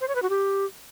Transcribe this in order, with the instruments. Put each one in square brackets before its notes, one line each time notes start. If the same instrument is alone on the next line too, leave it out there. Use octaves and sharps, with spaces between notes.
[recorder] C5
C#5
B4
F#4
G4